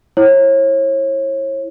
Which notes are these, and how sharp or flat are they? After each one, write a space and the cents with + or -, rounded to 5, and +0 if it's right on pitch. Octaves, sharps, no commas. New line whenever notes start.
E4 +0 C#5 -35